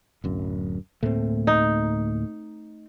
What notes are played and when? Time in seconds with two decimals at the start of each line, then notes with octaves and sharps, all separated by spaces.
0.24 D1 F#2
1.03 D2 A2 A3 A#3 C4
1.47 D#4